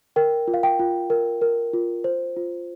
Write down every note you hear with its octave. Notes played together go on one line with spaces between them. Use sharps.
A#4 G5
F4
F5
G5
F4
A#4
A#4
F4
C5
F4